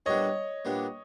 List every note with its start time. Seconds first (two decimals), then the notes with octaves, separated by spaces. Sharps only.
0.06 A#2 G3 B3 D4 C#5 D#5
0.65 A#2 G3 B3 D4